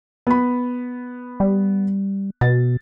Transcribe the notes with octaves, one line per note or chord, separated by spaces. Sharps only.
B3 B5
G3
B2 A6